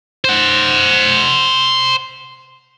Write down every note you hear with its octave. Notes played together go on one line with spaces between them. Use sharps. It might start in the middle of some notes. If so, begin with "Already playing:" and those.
C5 F#5